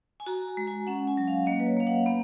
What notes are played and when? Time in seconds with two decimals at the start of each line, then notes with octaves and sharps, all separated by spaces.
0.20 G#5
0.26 F#4 A#5
0.48 A#5
0.57 G#3
0.67 G#5
0.87 C#4 F#5
1.07 G#5
1.17 F#3
1.27 F5
1.46 A#3 D#5
1.60 B4
1.67 C#5
1.76 A#3 F5
1.87 F#5
2.06 B3 A#5